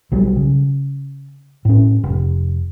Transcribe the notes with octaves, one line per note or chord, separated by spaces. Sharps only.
B1 F#3 G3
C#3
A2 C#4
F1